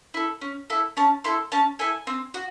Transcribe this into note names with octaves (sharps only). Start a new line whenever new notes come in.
E4 A4
C#4
E4 A4
C#4 A5
E4 A4 C6
C#4 A5
E4 A4 G#5
C4
F#4